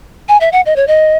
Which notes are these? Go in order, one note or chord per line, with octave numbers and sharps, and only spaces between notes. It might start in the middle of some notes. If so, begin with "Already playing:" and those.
G#5
E5
F#5
D#5
C#5
D#5